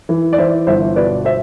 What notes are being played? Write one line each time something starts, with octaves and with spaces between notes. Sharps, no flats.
E3
D5
E3 C5 E5
G1 C5 E5
B2 B4 D5
C5 E5